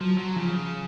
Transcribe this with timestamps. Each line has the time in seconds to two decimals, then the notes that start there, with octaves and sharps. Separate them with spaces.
0.01 F3 F#3
0.18 F#3
0.36 C#3 F3